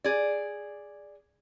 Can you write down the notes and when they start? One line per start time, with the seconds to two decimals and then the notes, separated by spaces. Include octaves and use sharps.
0.04 G#4 D5